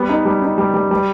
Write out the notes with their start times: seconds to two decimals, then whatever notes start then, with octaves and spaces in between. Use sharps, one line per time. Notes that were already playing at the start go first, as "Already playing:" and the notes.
Already playing: G3 B3
0.09 D#4
0.25 G3
0.42 D#4
0.58 G3
0.74 G3
0.91 G3